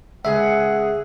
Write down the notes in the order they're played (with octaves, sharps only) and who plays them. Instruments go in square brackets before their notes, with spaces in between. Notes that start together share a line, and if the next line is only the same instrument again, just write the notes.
[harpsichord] C#2 [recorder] G#4 [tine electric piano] E5 [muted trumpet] F#5